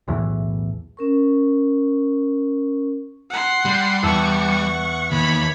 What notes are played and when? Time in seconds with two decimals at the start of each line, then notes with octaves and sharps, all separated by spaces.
0.08 B1 E2 A2 E3
0.97 C#4 A#4 C#6
3.30 F#5 C6
3.65 G3
4.03 E2 F#5 A5 C#6 E6
5.11 D#2 C#5 B5